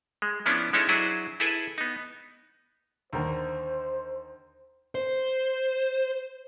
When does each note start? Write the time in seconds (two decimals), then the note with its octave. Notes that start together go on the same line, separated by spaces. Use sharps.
0.22 G#3
0.46 F3 B3 C#4 D4 E4 F4
0.73 G#3 C#4 D#4 E4 A4 C#5
0.89 F#3 D4 E4 F#4 G#4 C5
1.40 E4 G#4 A4 B4 E5
1.78 B3 D#4
3.13 D#2 D3 A#4 C5
4.95 C5